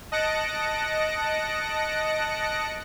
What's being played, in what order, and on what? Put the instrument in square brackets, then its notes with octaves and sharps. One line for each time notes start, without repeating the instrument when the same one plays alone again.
[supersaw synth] D#5 A5 F#6 A#6 C#7 D7